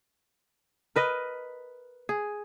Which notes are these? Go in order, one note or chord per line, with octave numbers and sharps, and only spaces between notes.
A#4 B4 D#5
G#4